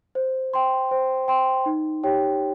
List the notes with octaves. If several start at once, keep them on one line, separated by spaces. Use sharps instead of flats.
C5
G5 C6
C5
G5 C6
D#4
G4 C#5 G5